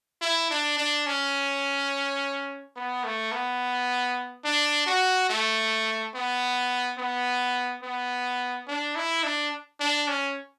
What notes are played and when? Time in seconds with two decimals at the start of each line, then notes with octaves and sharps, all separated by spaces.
0.22 E4
0.51 D4
0.78 D4
1.07 C#4
2.76 B3
3.04 A3
3.32 B3
4.44 D4
4.87 F#4
5.30 A3
6.14 B3
6.98 B3
7.83 B3
8.68 D4
8.96 E4
9.24 D4
9.80 D4
10.08 C#4